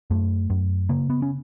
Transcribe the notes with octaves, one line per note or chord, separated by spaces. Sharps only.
F#2 A3
F#2
C#3 A#3
B3
C#4